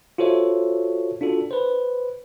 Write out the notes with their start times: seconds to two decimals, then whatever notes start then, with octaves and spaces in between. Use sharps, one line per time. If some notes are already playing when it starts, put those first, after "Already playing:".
0.18 F4 F#4 A4 C5 C#5 E5
1.21 D4 F4 F#4 A4
1.51 B4 C5